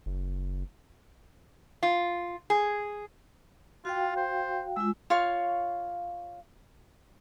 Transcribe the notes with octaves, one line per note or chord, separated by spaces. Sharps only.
F#1
F4
G#4
F4 F#4 F5 G5
C5
G#3 F4 E6
F4 C#5 F5 C#6